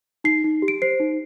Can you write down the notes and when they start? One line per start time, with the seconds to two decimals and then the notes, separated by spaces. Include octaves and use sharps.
0.24 D#4 C7
0.44 D#4
0.62 G4
0.68 D7
0.82 C5 C7
1.00 D#4